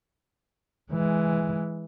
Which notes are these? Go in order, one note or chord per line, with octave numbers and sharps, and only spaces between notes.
E3 G#3